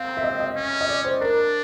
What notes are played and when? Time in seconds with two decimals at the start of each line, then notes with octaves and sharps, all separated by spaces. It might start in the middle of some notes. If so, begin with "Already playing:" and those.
Already playing: C4 F5
0.17 E5
0.24 D#5
0.40 D#5
0.56 C#4
0.81 D#5
0.89 D5
1.04 C5
1.21 D4 A#4